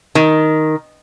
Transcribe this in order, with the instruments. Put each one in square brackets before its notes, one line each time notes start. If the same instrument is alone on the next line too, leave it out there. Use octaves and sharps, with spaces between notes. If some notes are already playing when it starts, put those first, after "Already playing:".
[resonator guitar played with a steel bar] D#3